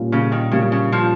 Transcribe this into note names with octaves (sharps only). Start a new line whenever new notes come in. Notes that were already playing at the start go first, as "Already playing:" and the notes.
Already playing: A#2 G3 A#3 C#4 F4
A#2 C#3
D#3
C#3 G3 A#3 C#4 F4
C#3
F3